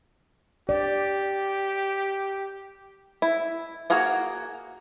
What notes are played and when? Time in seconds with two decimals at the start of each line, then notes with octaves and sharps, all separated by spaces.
0.69 G4 D5
3.22 E4
3.90 A#3 F#4 G#4 F5 F#5